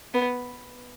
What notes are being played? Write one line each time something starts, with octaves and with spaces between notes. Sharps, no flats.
B3